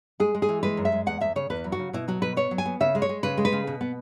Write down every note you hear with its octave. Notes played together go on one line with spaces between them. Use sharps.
G#3 G#4
G#3
G#4
E3
G#3 B4
F#2
E5
G#3
E2 F#5
E2 E5
C#3 C#5
E2 B4
F#3
F#4
C#3
B2 E4
F#3 F#4
B2 B4
B3 C#5
F#3
G#5
B3
C#3 E5
G#3
C#5
G#3
C#3 B4
G#3
B4
C#3
B2
B3